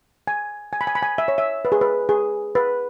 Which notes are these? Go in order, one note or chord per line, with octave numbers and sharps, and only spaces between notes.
G#5
G#5
B5
G#5
B5
G#5
E5
C#5
E5
B4
G#4
B4
G#4
B4